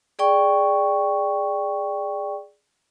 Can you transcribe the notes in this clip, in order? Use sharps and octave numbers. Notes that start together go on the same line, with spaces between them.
G#4 D5 G5 C#6